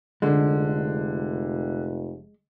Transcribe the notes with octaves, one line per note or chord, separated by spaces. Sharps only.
F1 D3 G#3